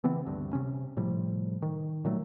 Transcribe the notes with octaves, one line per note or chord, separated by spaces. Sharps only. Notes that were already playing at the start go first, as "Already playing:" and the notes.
C#3 E3 B3 C4
D2 G2
C3 C#4
A2 C3 F3 G3
D#3
A#2 D#3 F#3 A3